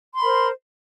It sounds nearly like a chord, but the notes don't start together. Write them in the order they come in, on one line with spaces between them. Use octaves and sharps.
C6 B5 A#4 C5